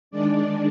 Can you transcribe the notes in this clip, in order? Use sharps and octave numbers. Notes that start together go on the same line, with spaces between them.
D#3 G#3 D4 D5